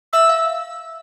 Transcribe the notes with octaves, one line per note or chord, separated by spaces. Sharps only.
E5 E6
F5